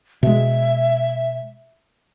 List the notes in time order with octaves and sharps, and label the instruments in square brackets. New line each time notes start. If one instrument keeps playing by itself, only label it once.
[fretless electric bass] B2 G#3 [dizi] E5